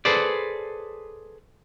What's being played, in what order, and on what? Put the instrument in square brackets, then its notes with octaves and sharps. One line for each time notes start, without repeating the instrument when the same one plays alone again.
[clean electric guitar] G#4 A4 B4 C5 D5